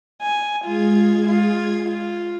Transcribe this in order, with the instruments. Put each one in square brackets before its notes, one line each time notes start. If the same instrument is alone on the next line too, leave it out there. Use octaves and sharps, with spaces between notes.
[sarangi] G#5
[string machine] G#3 G#4 G#6 [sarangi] F4
[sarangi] F4
F4